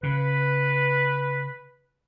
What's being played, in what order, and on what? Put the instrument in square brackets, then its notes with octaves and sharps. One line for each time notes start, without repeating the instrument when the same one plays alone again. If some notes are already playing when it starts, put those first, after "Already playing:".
[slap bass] C#3 [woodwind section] B4